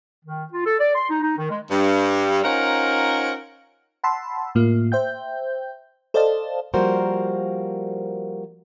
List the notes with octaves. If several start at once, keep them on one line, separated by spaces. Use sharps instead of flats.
D#3
F4
A4
D5
C6
D#4
D#4
D#3
G#3
G2 G3
C#4 D#4 F4 A#4 C5 F#5
F#5 A5 B5 C6 E6
A2 A#3 F4
C5 E5 G5 G6
A4 C5 D5 D#5 F5 A5
F3 G3 A#3 F#4 A#4 C5